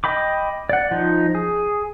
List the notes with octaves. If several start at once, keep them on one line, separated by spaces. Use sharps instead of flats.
D#5 G5 B5 D6
D5 F#5
F3 D#4
G#4